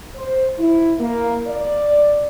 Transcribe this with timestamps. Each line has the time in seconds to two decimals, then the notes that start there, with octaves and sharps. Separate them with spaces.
0.16 C5
0.59 E4
0.99 A#3
1.47 D5